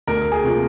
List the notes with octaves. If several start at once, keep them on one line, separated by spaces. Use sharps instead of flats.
D2 A#4
G#4
C3 F3 A#3